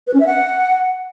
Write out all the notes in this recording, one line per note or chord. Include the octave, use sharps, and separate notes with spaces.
B4
C#4
E5
F#5